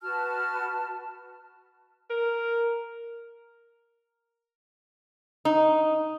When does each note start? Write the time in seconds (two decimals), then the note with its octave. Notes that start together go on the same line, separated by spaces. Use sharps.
0.02 F#4 B4 A5 F6
2.10 A#4
5.45 D#4